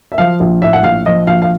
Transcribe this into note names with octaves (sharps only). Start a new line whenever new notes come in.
E5
F3 F5
A#1
A2 E5
F#5
A#1 F5
F3 D#5
A#1 F5
F5